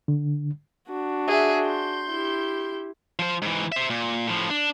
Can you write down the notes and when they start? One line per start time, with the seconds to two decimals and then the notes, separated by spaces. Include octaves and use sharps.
0.08 D3
0.88 D4 F#4
1.28 G#4 E5
1.66 C6 G6
2.09 E4 G4
3.19 F3 C5
3.42 G#2 E3
3.72 C5 E5
3.90 A#2
4.27 A2 F3
4.50 D4